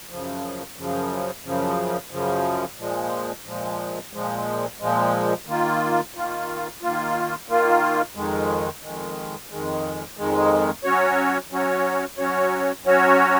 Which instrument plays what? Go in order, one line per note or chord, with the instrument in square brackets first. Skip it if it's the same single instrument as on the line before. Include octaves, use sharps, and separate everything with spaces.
[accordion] F#2 C#3 F3
F#2 C#3 F3
F#2 C#3 F3
F#2 C#3 F3
A#2 F3 G#3
A#2 F3 G#3
A#2 F3 G#3
A#2 F3 G#3
D#3 A#3 F4
D#3 A#3 F4
D#3 A#3 F4
D#3 A#3 F4
F2 D#3 G#3
F2 D#3 G#3
F2 D#3 G#3
F2 D#3 G#3
F#3 C#4 F#4 C#5
F#3 C#4 F#4 C#5
F#3 C#4 F#4 C#5
F#3 C#4 F#4 C#5